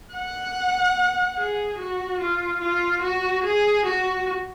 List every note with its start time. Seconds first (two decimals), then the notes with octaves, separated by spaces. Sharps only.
0.14 F#5
1.38 G#4
1.79 F#4
2.20 F4
2.61 F4
3.03 F#4
3.44 G#4
3.86 F#4